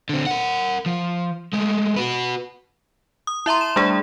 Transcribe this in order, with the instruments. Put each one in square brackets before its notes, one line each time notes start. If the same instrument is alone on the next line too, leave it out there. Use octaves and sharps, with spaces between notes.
[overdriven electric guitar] D3 C4
A#4 F#5
F3
G#3 A3
F#4 B4
[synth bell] D#6
E4 E5 A#5 C6
E7
G3 A3 D4 G#4